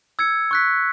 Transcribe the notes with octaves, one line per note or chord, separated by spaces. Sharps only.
E6 G#6 C#7
C#6 F#6 B6